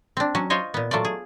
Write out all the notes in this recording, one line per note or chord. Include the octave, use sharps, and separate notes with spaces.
C4 D4
F#3 C#4
F4 C5 C#5 D#5
A#2 B3
F#3 A3 F4 D5
G#4